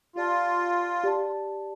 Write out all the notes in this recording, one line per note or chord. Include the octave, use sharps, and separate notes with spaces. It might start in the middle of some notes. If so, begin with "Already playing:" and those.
F4 G4 D5 A5
G4 D5 A5